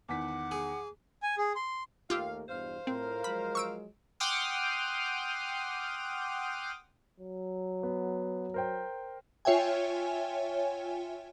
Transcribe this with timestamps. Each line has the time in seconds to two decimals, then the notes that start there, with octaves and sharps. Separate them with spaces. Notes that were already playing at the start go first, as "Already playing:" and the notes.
0.09 E2 D#3 F#5 D6 B6
0.51 G#4
1.23 G#5
1.38 G#4
1.56 C6
2.10 D#2 A3 A#3 F4 G4 F5 E6
2.49 E2 G2 B2 C5 F5
2.87 A2 C4 F4 A#4
3.24 F3 F#3 G#3 B5
3.55 C#6 E6 D7
4.20 F#5 G5 C6 D6 D#6 F6
7.20 F#3
7.83 B3
8.54 A#4 C5 G5
9.45 F4 C#5 E5 G5 G#5